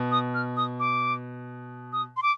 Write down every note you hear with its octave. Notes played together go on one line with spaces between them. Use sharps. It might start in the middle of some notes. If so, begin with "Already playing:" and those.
Already playing: B2
D#6
F6
D#6
D6
D#6
C6
D6